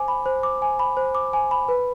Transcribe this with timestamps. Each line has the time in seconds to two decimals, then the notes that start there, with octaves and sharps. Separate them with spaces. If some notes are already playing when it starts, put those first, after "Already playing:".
Already playing: C5 G#5 D6
0.08 B5
0.26 C5
0.43 D6
0.62 G#5
0.79 B5
0.97 C5
1.15 D6
1.33 G#5
1.51 B5
1.69 B4